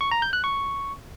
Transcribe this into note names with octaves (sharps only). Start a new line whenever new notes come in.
C#6
A#5
G6
F#6
C#6